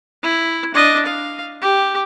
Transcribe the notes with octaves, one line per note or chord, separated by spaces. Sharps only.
E4
D4 D#5
F5
G4